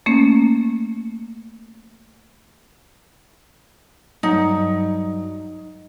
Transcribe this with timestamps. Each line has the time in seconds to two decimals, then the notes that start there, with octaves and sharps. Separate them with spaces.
0.06 A3 A#3 C#4
4.23 G2 F#3 D#4